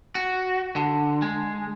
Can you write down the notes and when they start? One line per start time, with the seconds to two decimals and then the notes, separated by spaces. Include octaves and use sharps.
0.15 F#4
0.76 D3
1.22 G#3